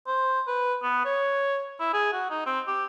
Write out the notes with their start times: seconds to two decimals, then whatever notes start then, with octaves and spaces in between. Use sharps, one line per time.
0.07 C5
0.48 B4
0.83 B3
1.05 C#5
1.80 E4
1.94 G#4
2.13 F#4
2.31 D#4
2.46 C4
2.68 G4